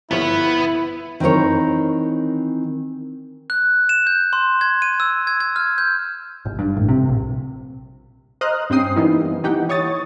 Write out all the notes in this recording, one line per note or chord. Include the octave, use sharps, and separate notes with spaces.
G1 F3 B3 E4 C#5
D#3 E3 C4 A#4 C#5
F#6
E7
G6
C6
G#6
D#7
E6
G#6
G#6
F6
G6
G1
G2
A1
C3
A#1
C5 D#5 A#5 D#6 F6 F#6
G2 C4 C#4 G5 D#6 C7
E3 G3 A#3 B3 D#4
E3 D#4 G4 F#5 G5
E3 C#5 C#6 D#6 A6